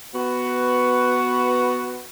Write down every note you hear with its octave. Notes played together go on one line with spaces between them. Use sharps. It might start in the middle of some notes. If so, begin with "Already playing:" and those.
B3 F#4 B4